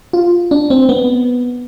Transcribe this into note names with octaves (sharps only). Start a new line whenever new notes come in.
F4
D4
C4
B3